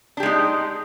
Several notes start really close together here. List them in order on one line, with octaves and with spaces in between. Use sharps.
D4 G4 G#3 D#4